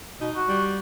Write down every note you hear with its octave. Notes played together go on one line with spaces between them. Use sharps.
B2 D#4
F#4
G3